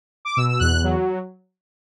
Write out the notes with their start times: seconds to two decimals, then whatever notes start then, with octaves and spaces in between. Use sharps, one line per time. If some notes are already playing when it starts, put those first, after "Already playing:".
0.25 D6
0.37 B2 E6
0.49 E6
0.59 E2 F#6
0.84 F#3